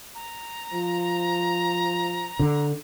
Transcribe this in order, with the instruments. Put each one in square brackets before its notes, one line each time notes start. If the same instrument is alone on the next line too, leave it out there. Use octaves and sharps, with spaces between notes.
[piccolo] A#5
[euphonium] F3
[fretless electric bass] D3